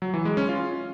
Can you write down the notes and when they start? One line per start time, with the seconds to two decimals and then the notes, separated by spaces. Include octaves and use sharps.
0.02 F#3
0.14 E3
0.25 G#3
0.37 C#4
0.49 F4